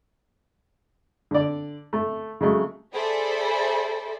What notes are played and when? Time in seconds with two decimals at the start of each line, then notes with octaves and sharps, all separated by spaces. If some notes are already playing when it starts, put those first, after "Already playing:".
1.31 D3 D5
1.93 A3
2.41 C#3 F#3 G#3 A3
2.93 G#4 A4 C5 D5 E5 B5